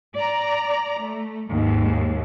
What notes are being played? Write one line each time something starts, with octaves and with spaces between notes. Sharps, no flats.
D5 A#5
A3
D#2 G#2